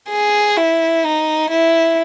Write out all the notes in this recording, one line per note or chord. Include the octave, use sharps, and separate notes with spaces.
G#4
E4
D#4
E4